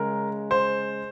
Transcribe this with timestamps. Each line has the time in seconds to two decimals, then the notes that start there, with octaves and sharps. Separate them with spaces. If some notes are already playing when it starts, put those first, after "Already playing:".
Already playing: C#3 G#3 A#4
0.51 C5